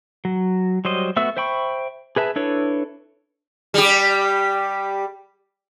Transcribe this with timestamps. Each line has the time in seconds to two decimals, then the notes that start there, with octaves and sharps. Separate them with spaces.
0.25 F#3
0.85 F#3 G3 C5 D#5
1.16 A3 B3 F#4 E5 E6
1.37 C5 E5 G5 B5 C#6
2.16 G#4 B4 E5 A5
2.36 D4 E4 A4 B4 C#5
3.74 G3 G4